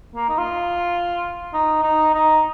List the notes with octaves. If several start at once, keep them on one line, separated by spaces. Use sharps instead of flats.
A#3
D#4
F4
D#4
D#4
D#4